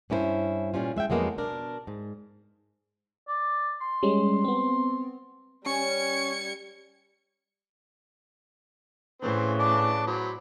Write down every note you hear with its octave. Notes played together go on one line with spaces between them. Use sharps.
G2 C#4 E4 A4 C5
A#2 G3 C#4 F4
G#3 E5 F5 G5
F2 F#3 G#3 A#3 B3
B2 D4 A#4
G#2
D5
C6
G3 G#3 C#4
B3 C4
G3 C#4 G#6 C#7
A2 C#3 E3 C4 C5
D5 A5 D6
F#3 C5 B5